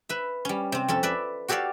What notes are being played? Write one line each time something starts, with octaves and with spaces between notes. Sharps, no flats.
B4 E5
G3 C#4
C3 C4
F2 C#4 A4
B4 D5 E5
F#4 G4 A4 C#5 D5 F5